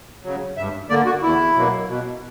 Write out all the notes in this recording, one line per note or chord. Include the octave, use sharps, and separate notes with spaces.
C#3 F#3
G2 E5
D3 A#3 D5
F#4
E2 E4
B2 F#3 A#3
B2